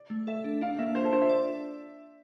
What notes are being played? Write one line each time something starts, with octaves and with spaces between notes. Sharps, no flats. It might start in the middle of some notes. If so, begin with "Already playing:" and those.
Already playing: D5
A3
A4 E5
D4
D4 F5
A#3 E5
F4 C5
A4
D4 C5
E5
D5